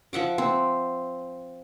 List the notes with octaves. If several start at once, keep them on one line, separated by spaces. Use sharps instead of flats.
F3 E5 F#5 D6
C4